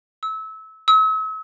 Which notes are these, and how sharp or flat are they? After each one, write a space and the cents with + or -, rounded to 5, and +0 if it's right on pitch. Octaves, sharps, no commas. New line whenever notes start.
E6 -25
E6 -40